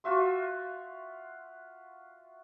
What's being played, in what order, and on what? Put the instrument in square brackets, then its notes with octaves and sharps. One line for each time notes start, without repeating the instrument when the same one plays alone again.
[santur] F4 F#4 E5 C6